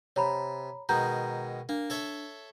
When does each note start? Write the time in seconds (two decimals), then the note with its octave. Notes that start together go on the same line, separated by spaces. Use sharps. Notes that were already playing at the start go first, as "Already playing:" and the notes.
0.16 C3 C#5 A#5 B5
0.89 B2 D#3 G#3 A#5 G6
1.69 A#3 D4
1.90 A4 C#5 E5